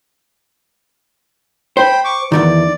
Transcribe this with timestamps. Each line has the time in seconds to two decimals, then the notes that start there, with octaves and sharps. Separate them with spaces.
1.77 C5 G5 B5
2.05 C#6 D6
2.32 E2 G#2 D#3 D5